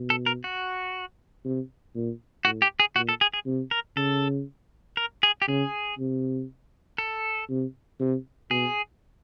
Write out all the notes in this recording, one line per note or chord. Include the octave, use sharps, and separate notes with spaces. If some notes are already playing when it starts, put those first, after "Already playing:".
Already playing: B2
A4
A#4
F#4
C3
A#2
A2 F#4
G4
G#4
A#2 F#4
A4
G#4
G#4
C3
A#4
C#3 A4
A#4
G#4
G4
C#3 G#4
C3
A4
C3
C3
B2 G#4